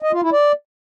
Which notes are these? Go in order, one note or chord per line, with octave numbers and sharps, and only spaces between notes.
D#5
F4
E4
D5